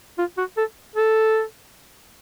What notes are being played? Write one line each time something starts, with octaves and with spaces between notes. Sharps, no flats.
F4
F#4
A4
A4